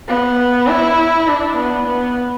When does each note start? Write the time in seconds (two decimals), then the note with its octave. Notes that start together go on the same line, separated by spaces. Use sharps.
0.08 B3
0.68 E4
1.27 D4
1.57 B3
1.87 B3